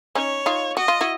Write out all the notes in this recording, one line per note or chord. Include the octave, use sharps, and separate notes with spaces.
C#4 D#4 C#5
D#4 F4
F#4 D#5
F4
E4 F#4